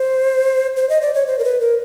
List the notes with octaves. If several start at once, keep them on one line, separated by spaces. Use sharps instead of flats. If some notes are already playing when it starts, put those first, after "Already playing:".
Already playing: C5
C5
D#5
D5
C#5
C5
A#4
B4
A#4